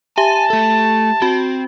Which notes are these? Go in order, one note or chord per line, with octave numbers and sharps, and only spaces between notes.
G4 E5 G#5 A5
A3 A4
C4 F#4